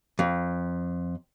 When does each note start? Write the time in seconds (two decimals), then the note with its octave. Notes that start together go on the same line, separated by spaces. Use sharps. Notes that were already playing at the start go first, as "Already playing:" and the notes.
0.19 F2